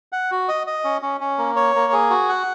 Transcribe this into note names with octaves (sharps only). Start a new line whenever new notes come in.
F#5
F#4
D#5
D#5
C#4
C#4
C#4
A#3
C#5
A#3
G#4
F#4
F#5